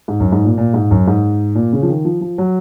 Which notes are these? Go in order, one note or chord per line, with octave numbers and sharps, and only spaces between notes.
G#2
F#2
G#2
A#2
A#2
G#2
F#2
G#2
A#2
C#3
F3
D#3
F3
F3
F#3